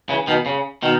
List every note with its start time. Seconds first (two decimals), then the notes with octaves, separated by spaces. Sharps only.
0.09 C#3 E3
0.27 B2 D#3
0.46 C#3
0.83 B2 D#3